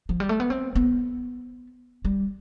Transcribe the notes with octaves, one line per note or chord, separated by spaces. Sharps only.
F3
G3
A3
B3
C4
B3
G3